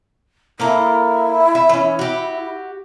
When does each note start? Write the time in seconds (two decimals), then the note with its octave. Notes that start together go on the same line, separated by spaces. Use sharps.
0.60 A#3 E4 A4 A#4
1.55 E5
1.69 E3 C#4
1.99 F#4 G4